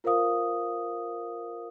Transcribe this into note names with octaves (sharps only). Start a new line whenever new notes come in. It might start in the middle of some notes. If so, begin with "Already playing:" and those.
F4 A#4 C5 F5 D#6